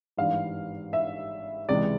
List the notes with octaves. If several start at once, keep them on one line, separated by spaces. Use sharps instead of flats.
G#1 G2 E3 G3 F5
E5
C#2 C3 E3 G#3 D5